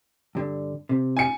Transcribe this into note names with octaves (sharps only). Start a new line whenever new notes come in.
G2 D3
C3
G#5 C#7